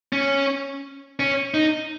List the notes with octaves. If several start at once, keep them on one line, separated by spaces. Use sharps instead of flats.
C#4
C#4
D#4